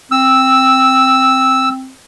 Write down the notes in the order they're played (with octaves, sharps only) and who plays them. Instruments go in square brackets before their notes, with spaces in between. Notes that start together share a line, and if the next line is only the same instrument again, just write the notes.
[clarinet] C4 [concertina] E6